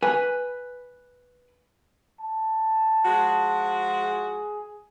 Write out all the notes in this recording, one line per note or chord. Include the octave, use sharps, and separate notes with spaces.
B4 G#5
A5
F3 G#3 F#4
G#4